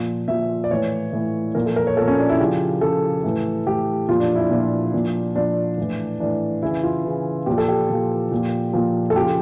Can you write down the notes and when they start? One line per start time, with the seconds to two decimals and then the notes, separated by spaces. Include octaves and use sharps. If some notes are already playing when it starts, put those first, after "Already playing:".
Already playing: A#2 F3
0.28 A#2 F3 E5
0.64 D5
0.71 A2 E3 C#5
1.13 A2 E3
1.55 A#2 F3 A#4
1.66 A4
1.76 A#4
1.87 C#5
1.97 A#2 F3 A4
2.08 C#4
2.19 D4
2.29 E4
2.40 C#3 F3 G4
2.81 C#3 F3 A4
3.24 A2 E3
3.66 A2 E3 G4
4.09 A#2 F3 F4
4.20 D4
4.35 E4
4.40 D4
4.51 A#2 F3 D4
4.93 A#2 F3
5.35 A#2 F3 D4
5.78 A2 E3
6.20 A2 E3 D4
6.62 C#3 E3 E4
6.83 F4
7.04 C#3 E3
7.46 A#2 F3 G4
7.58 A4
7.68 G4
7.90 A#2 F3
8.31 A#2 F3
8.73 A#2 F3
9.10 A4
9.16 C#3 F3 G4